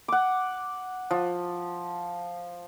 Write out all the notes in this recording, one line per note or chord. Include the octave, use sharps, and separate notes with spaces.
F#5 D6
F3